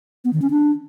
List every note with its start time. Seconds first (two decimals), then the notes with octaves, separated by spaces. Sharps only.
0.25 B3
0.33 D#3
0.42 C#4
0.50 D4